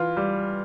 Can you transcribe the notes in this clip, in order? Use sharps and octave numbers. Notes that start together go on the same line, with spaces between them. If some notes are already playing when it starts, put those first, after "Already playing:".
Already playing: E3 F4
G3